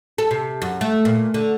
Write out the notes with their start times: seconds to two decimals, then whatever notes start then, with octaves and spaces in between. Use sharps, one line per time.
0.18 A4
0.31 C3
0.62 F#2
0.81 A3
1.05 A#2
1.34 D3